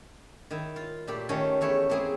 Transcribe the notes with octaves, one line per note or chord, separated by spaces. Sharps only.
D#3 E4
F4
A#2 A3 G4 B5
D#3 A3 C#4 A4 C#5
E2 A3 C#5 G5 B5
A3 A#3 C4 E4 G#4